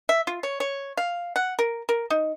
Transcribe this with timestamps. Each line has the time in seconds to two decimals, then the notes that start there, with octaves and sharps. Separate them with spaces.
0.09 E5
0.27 F4
0.43 C#5
0.60 C#5
0.97 F5
1.36 F#5
1.59 A#4
1.89 A#4
2.10 D#4